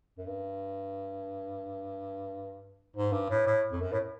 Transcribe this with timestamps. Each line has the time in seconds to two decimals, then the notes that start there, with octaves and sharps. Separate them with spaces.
0.18 F#2
0.26 G2
2.96 G#2
3.12 G2
3.30 A2
3.47 A2
3.72 F2
3.81 F#2
3.92 A2